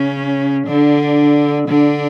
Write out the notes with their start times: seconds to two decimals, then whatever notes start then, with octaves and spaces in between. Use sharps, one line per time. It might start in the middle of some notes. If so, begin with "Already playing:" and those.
Already playing: C#3 C#4
0.67 D3 D4
1.68 D3 D4